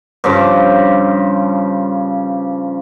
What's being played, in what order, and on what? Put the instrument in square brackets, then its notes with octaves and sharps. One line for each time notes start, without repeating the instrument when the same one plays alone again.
[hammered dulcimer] G2 C#3 F3 D6